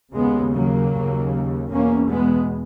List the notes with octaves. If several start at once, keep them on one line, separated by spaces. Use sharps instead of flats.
D#2 C#3 G#3 B3
F#3 A#3
D#2 C#3
E2 B2 A#3 C#4
G#3 B3